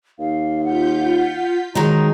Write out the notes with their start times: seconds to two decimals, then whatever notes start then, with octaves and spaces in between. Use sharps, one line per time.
0.19 D#2 F5
0.64 F4 F#5 G6 B6
1.75 D#3 F#3 G#3 D#4 A#5